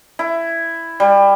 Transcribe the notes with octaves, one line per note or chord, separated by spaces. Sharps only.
E4
G3